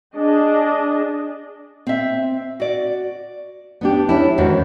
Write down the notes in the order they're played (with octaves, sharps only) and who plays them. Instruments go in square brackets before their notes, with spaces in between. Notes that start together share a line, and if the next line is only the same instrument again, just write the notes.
[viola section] D4 G#4 D#5
[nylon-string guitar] C4 E5
F#4 D5
B3 D4 G4
C#4 D4 E4
E2 G#2 D#3 C#4 F#4